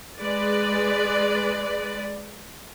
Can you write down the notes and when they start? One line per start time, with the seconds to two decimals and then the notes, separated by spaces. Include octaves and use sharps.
0.18 G#3 B4 D5